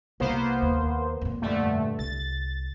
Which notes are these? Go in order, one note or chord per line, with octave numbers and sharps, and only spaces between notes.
C2 A#3 B3 C5
D#2
F2 A#2
G2 D3 A3
C2 A6